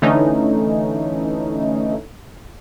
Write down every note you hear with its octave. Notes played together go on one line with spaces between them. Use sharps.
D3 E3 A3 C#4 D#4